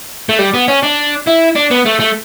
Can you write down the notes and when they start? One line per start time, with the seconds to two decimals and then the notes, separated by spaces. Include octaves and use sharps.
0.29 A3
0.39 G3
0.54 B3
0.68 C#4
0.83 D4
1.27 E4
1.56 D4
1.71 B3
1.85 A3
2.00 A3